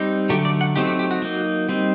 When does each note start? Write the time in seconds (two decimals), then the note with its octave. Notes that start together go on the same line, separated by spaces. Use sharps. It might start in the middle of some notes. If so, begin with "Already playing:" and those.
Already playing: G3 C4 D#4
0.29 D3 F#3 A3 G4
0.45 D5
0.61 F#5
0.76 F#3 A3 C4 D#4 G4
0.87 G4
0.99 G4
1.11 F#4
1.22 F#3 A#3 D#4
1.69 G3 C4 D#4